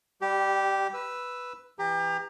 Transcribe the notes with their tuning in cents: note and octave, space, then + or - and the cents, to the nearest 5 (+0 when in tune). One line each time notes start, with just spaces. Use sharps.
G3 +15 G4 -10
B4 +0 E6 +0
E3 +15 G4 +35 A#5 +0